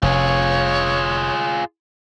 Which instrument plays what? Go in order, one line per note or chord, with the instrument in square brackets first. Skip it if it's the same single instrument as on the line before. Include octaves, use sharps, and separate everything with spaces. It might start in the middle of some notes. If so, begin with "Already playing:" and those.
[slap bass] F1 [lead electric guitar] F4 G#4 [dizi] C#5